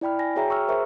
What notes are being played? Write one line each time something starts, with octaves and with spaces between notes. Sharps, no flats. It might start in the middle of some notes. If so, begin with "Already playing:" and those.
E4 D5 G5 B5 F6
G#5 A#6
F#4 G#4 C#5 E5 G5 A#5
C#6 E6 F6
G#4 A#4 C5 E5 A#5 C#6